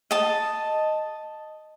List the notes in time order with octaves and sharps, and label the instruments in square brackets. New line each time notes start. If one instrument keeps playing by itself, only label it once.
[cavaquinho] D#5 A5